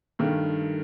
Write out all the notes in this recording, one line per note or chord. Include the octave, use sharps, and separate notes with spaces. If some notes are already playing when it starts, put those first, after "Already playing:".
G2 D#3 A3